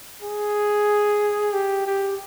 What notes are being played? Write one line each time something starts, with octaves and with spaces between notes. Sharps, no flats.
G#4
G4
G4